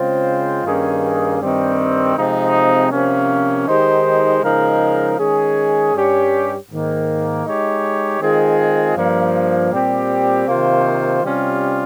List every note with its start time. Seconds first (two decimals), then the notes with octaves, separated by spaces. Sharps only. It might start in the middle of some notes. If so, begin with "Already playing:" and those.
Already playing: C#3 G#3 C4 F4 C5
0.64 G2 D#3 A#3 C#4 G#4
1.40 G2 D#3 G3 C4
2.16 C3 F3 G#3 C4 D#4
2.92 C3 F3 A#3 C#4
3.67 D#3 G#3 D#4 G4 C5
4.42 C#3 F3 G#3 D#4 A#4
5.18 D#3 G#3 C#4 G#4
5.94 G2 G3 C#4 G4 C#5
6.69 G#2 D#3 A#3
7.44 G#3 D#4 G4 C#5
8.21 D#3 G#3 C4 F4 G#4
8.96 G2 F3 A#3
9.71 A#2 G3 C4 G4
10.47 C3 D#3 A#3 F4 C5
11.22 C3 G3 C#4 F4